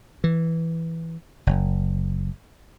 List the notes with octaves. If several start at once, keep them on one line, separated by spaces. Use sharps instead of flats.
E3
F#1